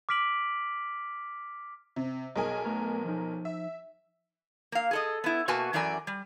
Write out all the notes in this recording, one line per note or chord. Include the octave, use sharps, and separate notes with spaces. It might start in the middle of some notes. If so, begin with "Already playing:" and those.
D6 F6 B6 D7 F#7
C3
B1 G#4 A#4 D#5 G#5
A3 B3 A#5
F3 D#4
E5
A#3 F5
G#4 A4 D#5
B3 E4
B2 A#3 F#4 B4 G#5 A5
F#2 E3 A4 A#4 D5 G#5
G3